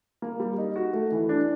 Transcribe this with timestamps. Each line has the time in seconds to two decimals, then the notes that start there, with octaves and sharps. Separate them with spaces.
0.22 A#3
0.40 G3
0.58 D#4
0.76 F#4
0.93 A3
1.12 E3
1.29 D4